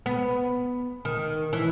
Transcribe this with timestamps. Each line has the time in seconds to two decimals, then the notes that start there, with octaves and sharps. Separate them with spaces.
0.06 B3
1.05 D#3
1.53 E3